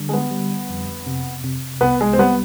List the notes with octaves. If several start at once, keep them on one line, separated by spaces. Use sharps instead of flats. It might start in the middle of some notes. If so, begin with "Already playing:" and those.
Already playing: D3 G3
G#3
B3
G3
F2
C3
C3
C2 B3
G#3
C4
G3 B3